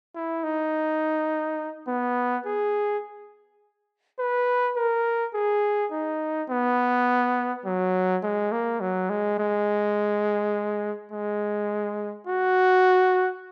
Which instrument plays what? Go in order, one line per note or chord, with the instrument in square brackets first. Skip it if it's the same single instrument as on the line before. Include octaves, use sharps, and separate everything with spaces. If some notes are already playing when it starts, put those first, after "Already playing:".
[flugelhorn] E4
D#4
B3
G#4
B4
A#4
G#4
D#4
B3
F#3
G#3
A#3
F#3
G#3
G#3
G#3
F#4